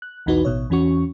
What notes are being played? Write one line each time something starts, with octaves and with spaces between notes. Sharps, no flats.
F#6
B1 E2 E3 D#4 F#4 B4
A1 B2 C#5
E2 E3 C#4 F#4 C#6